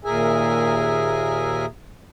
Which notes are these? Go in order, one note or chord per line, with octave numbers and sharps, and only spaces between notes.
D#2 A#2 G#4 A#4 E5 G#5